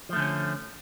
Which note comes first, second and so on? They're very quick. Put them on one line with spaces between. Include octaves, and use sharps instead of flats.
F3 A3 D3 C#4